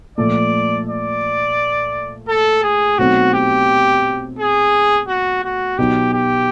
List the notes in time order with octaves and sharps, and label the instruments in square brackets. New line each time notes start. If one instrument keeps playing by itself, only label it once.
[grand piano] A#2 F3 A3 [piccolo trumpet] D5
[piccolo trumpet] D5
A4
G#4
[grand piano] B2 F#3 A3 C4 D#4 [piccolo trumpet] F#4
[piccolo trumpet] G4
G#4
F#4
F#4
[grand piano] B2 F#3 B3 D#4 [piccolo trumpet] G4
[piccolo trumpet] G4